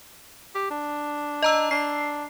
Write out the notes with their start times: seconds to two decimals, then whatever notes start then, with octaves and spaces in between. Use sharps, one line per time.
0.55 G4
0.70 D4
1.42 D#5 A#5 E6
1.71 D4 C7